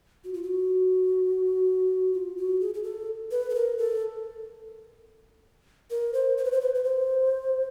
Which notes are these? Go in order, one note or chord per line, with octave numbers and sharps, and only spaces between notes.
F#4
F4
F#4
F4
F#4
G#4
G#4
A4
B4
A4
A#4
A4
A#4
C5
C5
B4
C5
B4
B4
C5